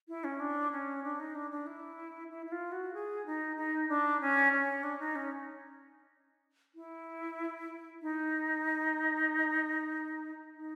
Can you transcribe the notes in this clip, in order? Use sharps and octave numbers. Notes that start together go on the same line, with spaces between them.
E4
C#4
D4
C#4
D4
D#4
D4
D4
E4
E4
E4
F4
F#4
G#4
D#4
D#4
D4
C#4
C#4
D4
D#4
C#4
E4
D#4
D#4